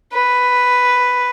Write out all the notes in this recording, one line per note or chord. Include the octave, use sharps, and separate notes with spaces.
B4